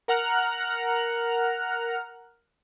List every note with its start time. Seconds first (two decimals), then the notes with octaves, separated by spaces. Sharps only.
0.08 A#4 F#5 A#5 F6 F#6